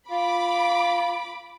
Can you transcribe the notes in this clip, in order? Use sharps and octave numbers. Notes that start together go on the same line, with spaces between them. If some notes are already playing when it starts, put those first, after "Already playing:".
F4 B5 D6